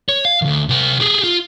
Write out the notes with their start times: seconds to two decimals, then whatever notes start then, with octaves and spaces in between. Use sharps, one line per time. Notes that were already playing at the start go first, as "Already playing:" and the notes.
0.09 C#5
0.25 F5
0.42 D2 D#3
0.69 C3 A#4
1.00 G4 G#4
1.24 F4